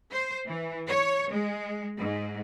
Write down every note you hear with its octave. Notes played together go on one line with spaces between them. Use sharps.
C5
E3
C#5
G#3
G#2